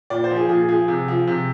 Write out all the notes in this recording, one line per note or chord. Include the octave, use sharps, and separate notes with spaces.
A#2 D5
C5
F3
G#4
A#2 G#4
F3 G#4
C3
F3
C3